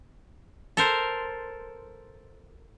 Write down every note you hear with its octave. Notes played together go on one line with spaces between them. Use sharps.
A4 A#4 C5